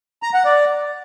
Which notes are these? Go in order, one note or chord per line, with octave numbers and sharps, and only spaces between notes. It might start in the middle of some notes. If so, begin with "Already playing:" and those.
A#5
F#5
D5